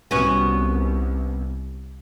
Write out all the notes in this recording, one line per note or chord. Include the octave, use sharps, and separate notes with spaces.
C2 B3 C#4 F#4